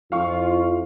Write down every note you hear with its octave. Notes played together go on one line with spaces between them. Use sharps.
F2 E4 F4 F5 C#6